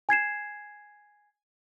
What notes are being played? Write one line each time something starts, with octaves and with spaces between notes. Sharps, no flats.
G#5 G#6 C7 E7